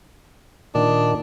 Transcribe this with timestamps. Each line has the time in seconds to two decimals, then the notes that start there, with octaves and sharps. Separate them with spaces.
0.75 A#2 D#3 D4